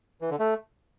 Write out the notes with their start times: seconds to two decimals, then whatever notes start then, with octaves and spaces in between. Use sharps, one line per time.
0.22 E3
0.31 D3
0.39 A3